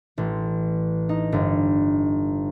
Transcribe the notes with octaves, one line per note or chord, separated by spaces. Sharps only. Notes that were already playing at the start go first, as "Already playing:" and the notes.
A1
D#4
G1